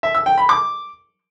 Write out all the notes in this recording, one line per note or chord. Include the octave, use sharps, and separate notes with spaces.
E5
E6
G5
B5
D6